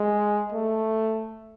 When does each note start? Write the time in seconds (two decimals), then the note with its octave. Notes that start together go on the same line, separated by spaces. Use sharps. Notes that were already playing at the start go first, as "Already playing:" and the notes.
Already playing: G#3
0.52 A3